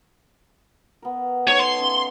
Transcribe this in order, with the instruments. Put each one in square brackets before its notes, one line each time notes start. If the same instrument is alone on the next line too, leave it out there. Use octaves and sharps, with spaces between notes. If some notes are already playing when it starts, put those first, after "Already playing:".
[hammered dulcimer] B3 A#4
[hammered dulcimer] D#4 A4 B4 [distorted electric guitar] C#5
[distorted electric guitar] C6
[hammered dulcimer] C#4 E5 F5